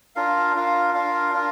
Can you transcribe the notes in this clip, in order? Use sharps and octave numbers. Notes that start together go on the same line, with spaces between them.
D4 F4 A#4 F5
D4 F4 A#4 F5
D4 F4 A#4 F5
D4 F4 A#4